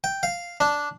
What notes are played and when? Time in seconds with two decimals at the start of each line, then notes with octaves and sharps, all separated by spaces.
0.04 G5
0.23 F5
0.60 D4